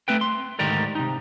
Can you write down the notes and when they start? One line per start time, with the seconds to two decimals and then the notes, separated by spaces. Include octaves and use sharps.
0.08 A3 C4 B4 G5
0.21 C6
0.59 D2 G#2 D#3 G4 A#4 D5
0.95 C3 D#4